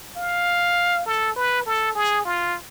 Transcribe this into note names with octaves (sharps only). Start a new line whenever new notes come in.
F5
A4
B4
A4
G#4
F4